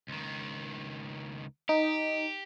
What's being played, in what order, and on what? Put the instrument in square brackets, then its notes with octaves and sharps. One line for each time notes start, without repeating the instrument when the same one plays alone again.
[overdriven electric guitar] C#2 D#3
[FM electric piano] D#4 [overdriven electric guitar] G4